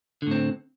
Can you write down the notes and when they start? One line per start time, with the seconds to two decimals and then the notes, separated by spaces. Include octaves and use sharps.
0.22 D3
0.27 A2
0.31 C4